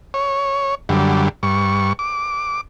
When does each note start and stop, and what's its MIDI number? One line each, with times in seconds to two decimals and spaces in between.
0.14 0.75 73
0.89 1.29 42
0.89 1.29 50
0.89 1.29 55
1.43 1.93 43
1.43 1.93 85
1.99 2.61 86